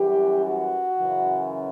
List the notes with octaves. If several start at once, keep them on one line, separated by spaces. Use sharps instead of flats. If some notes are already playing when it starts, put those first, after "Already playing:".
Already playing: F#2 E3 G3 G4
F#4
F#2 C#3 E3